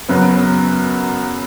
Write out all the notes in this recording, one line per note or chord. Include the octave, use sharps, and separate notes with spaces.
F#2 C#3 F#3 B3 B4